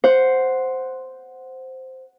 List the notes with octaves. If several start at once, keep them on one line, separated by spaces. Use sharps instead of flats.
C5 F#5